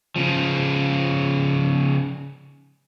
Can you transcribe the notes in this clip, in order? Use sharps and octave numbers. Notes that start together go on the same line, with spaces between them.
C#3 F3